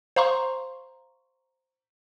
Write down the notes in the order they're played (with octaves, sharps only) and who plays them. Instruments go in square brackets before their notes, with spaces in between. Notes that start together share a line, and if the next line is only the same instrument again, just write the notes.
[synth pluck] C5 F5 A#5 C6 C#6